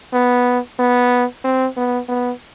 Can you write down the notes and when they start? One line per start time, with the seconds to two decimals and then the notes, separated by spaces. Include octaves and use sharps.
0.13 B3
0.79 B3
1.44 C4
1.77 B3
2.08 B3